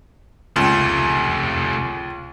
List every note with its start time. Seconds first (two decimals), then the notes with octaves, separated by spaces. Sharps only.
0.56 C#2 C3 A3